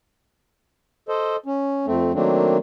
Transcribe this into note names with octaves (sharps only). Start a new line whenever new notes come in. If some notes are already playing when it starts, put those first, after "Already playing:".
A4 C5 D#5
C#4
F2 A3 C4
D#3 F#3 A3 A#3 C4 D4